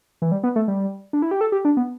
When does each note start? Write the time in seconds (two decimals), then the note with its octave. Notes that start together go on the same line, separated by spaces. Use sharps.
0.22 E3
0.32 G3
0.43 B3
0.56 A3
0.68 G3
1.13 D4
1.22 E4
1.31 G4
1.41 A4
1.52 G4
1.65 D4
1.77 B3